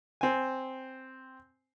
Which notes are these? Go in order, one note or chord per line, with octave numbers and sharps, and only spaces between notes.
C4 G#5